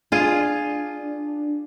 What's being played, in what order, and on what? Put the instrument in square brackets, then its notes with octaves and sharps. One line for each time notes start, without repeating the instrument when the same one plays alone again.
[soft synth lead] D4 [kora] F4 G#4